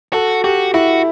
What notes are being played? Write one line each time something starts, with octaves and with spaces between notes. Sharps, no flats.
F#4 A4
F#4 G4
E4 F#4